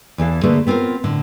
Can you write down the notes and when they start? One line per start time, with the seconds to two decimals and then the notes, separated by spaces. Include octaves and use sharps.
0.18 E2 E3 A4 F5
0.43 D3 A3 A#3 G#4 B4
0.67 B3 C4 F4 G4 A#4
1.04 A2 D3